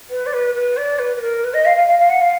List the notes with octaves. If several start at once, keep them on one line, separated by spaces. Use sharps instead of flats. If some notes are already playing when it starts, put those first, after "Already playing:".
B4
D5
B4
B4
D5
B4
B4
A#4
B4
D#5
F5
F5
F5
F5
F#5
F5